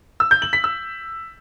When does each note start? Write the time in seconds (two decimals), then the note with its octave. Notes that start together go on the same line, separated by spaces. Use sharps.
0.20 E6
0.31 G6
0.42 F#7
0.53 B6
0.64 E6